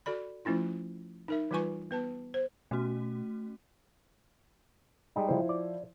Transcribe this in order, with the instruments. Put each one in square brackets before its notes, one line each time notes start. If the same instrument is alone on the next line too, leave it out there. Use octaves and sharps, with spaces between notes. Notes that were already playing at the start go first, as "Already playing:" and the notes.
[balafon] F#4 A4 D5 B5
F3 A3 C#4 E4 F4
D#4 A#4 E5
E3 G3 F4 B4 G#5 C#6
B3 B4 A5
C5
[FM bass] B2 [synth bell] A3 C#4 F#4
[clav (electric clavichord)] G3 G#3 D#4
[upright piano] F3 E4 C5
[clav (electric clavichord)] D5